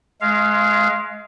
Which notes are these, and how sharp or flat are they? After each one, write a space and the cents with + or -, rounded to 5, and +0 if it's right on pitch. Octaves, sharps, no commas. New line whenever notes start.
G#3 +20 F5 -20